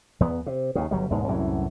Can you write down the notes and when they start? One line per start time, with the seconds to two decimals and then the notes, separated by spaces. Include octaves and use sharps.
0.20 E2 B3
0.46 C3
0.75 D#2 C#3
0.91 G1 F#3 G3
1.10 E1 D#2 G#2 G#3
1.28 C2 F#2 A2 E3